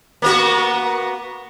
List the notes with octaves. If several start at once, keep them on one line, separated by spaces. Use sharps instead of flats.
A#3 B3 F#4